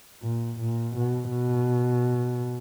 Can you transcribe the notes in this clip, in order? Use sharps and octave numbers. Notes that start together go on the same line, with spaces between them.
A#2
A#2
B2
B2